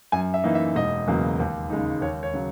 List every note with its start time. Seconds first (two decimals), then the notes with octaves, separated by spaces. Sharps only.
0.12 F#2 G#5
0.34 E5
0.44 E3 A#3 D#4
0.55 E5
0.76 E1 D#5
1.07 E2 C#3 F#3 A#3
1.39 D#2
1.70 C#3 G#3 D#4
2.01 D#2 C#5
2.23 C#5
2.34 C#3 F#3